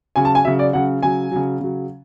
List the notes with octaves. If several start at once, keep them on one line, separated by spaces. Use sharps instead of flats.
C#3 F#3 G#5
A5
G#5
C#3 F#3 E5
D5
C#3 F#3 F#5
C#3 F#3 G#5
C#3 F#3
C#3 F#3